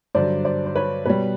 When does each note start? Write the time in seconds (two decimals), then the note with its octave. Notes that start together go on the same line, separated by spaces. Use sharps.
0.15 G2 D3 F#3 C5 D5
0.45 C5 D5
0.66 C5
0.75 B4 C#5
1.06 B2 G3 B4 C#5